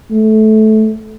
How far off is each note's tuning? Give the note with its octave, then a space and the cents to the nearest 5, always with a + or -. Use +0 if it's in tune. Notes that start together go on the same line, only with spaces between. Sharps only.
A3 -15